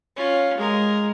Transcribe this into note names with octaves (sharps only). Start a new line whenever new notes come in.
C#4 F4
G#3 A#4